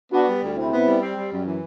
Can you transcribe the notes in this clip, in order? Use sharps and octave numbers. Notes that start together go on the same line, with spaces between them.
B3 D4 F#4
G3
D2
C3 C4 E4
B3
G3
C4
G3
F#2
E3